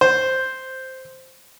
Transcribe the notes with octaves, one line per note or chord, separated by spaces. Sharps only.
C5